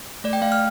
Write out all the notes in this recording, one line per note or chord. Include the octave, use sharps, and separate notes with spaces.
A3 D5
G5
A3 F5
F6